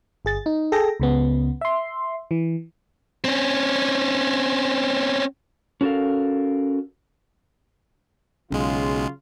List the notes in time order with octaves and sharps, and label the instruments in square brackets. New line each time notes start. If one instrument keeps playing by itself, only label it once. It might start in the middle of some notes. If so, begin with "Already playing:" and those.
[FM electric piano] G1 G#4 A6
D#4
G#4 A4 G5 A#6
C#2 C#3 B3
E5 C6
E3
[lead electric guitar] C4 C#4
[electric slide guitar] C#4 F#4 A4 A#4 F5
[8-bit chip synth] B1 G#3 [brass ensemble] C#3 F#3 F4